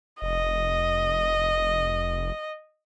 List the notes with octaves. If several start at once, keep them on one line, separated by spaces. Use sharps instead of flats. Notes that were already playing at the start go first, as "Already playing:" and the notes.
F1 D#5